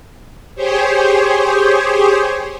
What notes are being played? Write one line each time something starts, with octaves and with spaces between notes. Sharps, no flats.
G4 G#4 C5 C#5